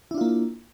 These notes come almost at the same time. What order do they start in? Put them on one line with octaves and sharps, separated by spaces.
E4 D4 F4 A#3